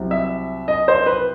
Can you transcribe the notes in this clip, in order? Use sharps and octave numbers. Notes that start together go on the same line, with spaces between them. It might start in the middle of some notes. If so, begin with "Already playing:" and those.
Already playing: C2 C3 F#3
E5
D#5
C5
B4